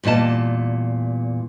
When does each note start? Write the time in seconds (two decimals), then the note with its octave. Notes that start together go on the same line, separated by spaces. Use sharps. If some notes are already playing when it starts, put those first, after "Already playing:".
0.04 E2 A#2 G3 D#5 A5